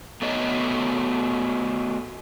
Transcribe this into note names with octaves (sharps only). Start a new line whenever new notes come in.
A3 B3 F#4 C#5 D#5